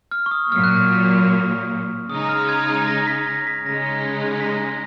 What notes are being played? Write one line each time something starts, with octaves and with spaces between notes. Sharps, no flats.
F6
C#6
D#6
A#2 F#3 A#3 F6
F#6
F6
C#3 G#3 D#4 D#6
F6
G#6
G#6
A#6
B6
A#6
B6
C#3 G#3 D#4 A#6
B6
A#6